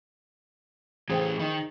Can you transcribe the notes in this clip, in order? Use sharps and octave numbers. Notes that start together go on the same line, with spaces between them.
A2 E3 G#4 C5 G5
D#3